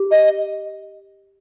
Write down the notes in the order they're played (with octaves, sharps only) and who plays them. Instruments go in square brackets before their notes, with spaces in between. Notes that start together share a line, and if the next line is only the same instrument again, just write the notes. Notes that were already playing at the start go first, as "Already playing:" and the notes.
Already playing: [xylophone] G4
[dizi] D#5